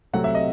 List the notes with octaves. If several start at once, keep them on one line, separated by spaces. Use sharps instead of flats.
C3 F#3 A3 C4 F#5
E5
D#5